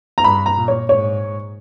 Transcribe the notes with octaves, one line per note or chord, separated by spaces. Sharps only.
A#5
G2 B5
A#5
A#2
C#5
G#2 C#5